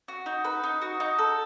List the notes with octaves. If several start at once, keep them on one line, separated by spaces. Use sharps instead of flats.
F#4
D#4
B4
D#4
F#4
D#4
A4